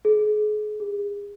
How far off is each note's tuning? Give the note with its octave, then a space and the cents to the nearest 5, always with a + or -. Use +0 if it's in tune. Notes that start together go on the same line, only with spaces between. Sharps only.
G#4 +35
G#4 -35